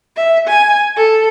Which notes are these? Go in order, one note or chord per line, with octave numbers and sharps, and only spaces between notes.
E5
G#5
A4